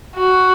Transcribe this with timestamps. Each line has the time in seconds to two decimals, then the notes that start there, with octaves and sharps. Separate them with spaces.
0.16 F#4